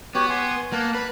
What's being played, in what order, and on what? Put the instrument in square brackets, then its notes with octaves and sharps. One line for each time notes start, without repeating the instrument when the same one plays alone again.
[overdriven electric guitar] B3 [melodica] F#4 G4 C#5
[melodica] G#5 C6
[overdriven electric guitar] A#3 [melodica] F#5 A5
[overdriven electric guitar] B4